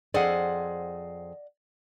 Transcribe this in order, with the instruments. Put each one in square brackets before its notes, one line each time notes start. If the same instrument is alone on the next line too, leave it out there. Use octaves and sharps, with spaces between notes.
[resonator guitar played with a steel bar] F2 G#4 C5 [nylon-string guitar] D5 D#5 F#5